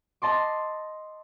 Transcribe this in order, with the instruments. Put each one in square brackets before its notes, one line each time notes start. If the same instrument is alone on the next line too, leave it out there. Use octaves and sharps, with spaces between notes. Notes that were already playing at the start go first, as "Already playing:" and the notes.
[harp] D#5 A5 C6 D6